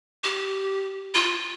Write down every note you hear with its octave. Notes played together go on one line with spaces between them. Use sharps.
G4
F4